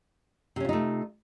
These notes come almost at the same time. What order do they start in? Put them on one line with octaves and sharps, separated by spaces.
C3 C#4 F4 D#4 A3